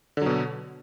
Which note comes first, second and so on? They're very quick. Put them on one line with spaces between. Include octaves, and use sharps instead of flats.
D3 F#3 B2